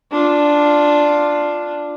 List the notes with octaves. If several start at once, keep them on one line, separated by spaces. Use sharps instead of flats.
D4 F4